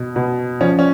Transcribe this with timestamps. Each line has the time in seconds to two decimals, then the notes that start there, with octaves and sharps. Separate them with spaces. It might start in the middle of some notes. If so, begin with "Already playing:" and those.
Already playing: B2
0.16 B2
0.61 F3 C#4
0.79 C#4